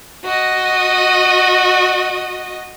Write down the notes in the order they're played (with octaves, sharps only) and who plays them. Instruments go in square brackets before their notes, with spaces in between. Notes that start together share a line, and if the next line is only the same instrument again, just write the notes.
[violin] F#4 D#5